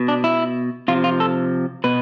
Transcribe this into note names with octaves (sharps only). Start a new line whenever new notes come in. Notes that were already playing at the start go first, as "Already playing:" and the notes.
Already playing: B2
D4
E4
C3 F3 F4
F4
A4
B2 B4